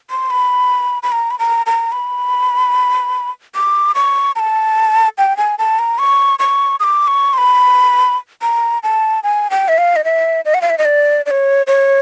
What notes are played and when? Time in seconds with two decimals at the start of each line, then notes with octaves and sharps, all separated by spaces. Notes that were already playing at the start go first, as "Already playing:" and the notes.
0.10 C6
0.31 B5
1.03 B5
1.12 A#5
1.31 B5
1.39 A#5
1.66 A#5
1.92 B5
3.55 D6
3.95 C#6
4.36 A#5
4.39 A5
5.18 G5
5.37 G#5
5.59 A5
5.79 A#5
5.99 C#6
6.39 C#6
6.80 D#6
6.84 D6
7.07 C#6
7.33 C6
7.38 B5
8.42 A#5
8.83 A5
9.24 G#5
9.50 G5
9.68 E5
9.78 F5
9.96 D#5
10.04 E5
10.45 D#5
10.54 F#5
10.62 F5
10.70 E5
10.78 D#5
10.85 D5
11.26 D5
11.31 C#5
11.67 C#5